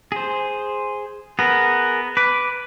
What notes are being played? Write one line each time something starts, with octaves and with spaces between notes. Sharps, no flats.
G#4 C5
B3 G#4 A#4
B4 D6